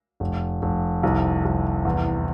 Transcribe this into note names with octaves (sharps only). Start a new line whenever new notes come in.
F1
F1
C2
C2
E2